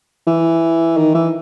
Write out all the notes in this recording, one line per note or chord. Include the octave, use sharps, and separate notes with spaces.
E3
D#3
E3